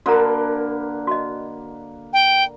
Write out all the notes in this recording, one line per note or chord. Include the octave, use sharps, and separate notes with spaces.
D3 A#3 F#4 A#4 B4 A#5
F#4 D#5
G5